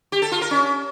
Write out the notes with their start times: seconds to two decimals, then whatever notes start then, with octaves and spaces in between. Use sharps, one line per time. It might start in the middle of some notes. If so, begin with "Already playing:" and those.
0.12 G4
0.22 A4
0.32 F4
0.41 A#4
0.51 C#4